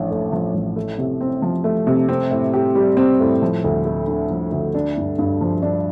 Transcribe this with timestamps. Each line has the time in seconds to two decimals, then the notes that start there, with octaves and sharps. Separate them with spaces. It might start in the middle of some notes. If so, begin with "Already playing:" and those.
Already playing: A1 F3 D4
0.11 A2
0.32 F3
0.54 A1
0.76 A3
0.98 C3
1.21 C4
1.42 F3
1.64 A3
1.87 C3
2.09 C4
2.31 A2
2.53 G4
2.75 G3
2.97 C4
3.20 A2
3.42 F3
3.64 D2
3.85 A3
4.07 D3
4.30 F3
4.52 D2
4.74 D4
4.97 G2
5.19 G2
5.41 F3
5.62 D4